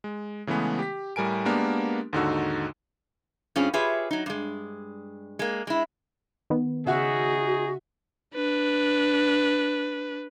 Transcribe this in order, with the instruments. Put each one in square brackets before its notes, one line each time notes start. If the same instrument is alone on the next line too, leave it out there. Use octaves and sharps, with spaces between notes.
[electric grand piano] G#3
C#3 E3 G#3 A3 B3
G4 B6
A2 G3 A#4 G#5 D7
G#3 A#3 B3 D4 G4 A#4
D#2 G#2 D3 D#4 F#4 E6
[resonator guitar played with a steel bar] G2 C4 C#4 F4 G#4
F4 G4 G#4 B4 C#5 E5
F#3 D#4
G2 G#3
G#3 A#3
G#3 E4
[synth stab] D#3 B3
[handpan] C#3 E5 F#5 [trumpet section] D#4 G#4 [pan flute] F#4
[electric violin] D4 B4